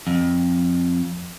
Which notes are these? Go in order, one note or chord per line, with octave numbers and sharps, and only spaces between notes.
F2